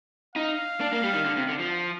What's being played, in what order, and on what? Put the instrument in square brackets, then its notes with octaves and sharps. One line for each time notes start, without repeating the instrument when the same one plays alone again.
[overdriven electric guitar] D#4 [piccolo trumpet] F5
[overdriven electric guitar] D4
A#3
G3
D#3
D3
C3
D3
F3